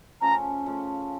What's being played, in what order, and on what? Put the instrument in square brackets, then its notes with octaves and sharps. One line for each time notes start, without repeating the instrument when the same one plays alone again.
[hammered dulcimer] C#3 F3 A3 C#4 [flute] A#5
[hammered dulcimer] C#3 F3 A3 C#4